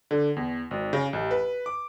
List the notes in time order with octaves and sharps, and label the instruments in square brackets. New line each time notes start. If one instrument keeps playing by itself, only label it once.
[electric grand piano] D3
E2
G#1
C#3
A1
B4
D6